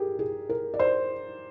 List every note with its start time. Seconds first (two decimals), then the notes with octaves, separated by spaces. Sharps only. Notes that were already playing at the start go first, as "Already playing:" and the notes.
Already playing: G4 G#4 A#4
0.19 G#4
0.49 A#4
0.74 D5
0.80 C5